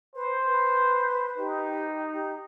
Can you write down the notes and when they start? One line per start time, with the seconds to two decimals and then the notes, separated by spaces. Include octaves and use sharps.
0.15 B4 C5
0.47 B4
1.38 D#4 G4
2.12 G4